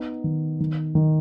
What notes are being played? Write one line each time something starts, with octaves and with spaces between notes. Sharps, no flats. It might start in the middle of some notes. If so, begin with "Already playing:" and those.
Already playing: B3 D#4
D#3
D#3
D#3